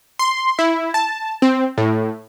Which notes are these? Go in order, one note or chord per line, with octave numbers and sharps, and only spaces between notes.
C6
E4
A5
C4
A2